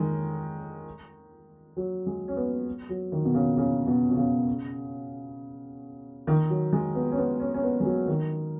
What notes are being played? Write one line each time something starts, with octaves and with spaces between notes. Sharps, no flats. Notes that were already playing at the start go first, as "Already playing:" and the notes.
Already playing: D#3 G#3
F#3
G#3
C#4
B3
F#3
D#3
B2
C#3
C#3
B2
B2
C#3
D#3
F#3
G#3
B3
C#4
B3
C#4
C#4
B3
G#3
F#3
D#3